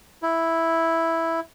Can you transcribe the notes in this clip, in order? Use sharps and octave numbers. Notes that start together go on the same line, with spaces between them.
E4